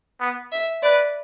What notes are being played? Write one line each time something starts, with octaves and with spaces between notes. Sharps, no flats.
B3
E5
B4 D5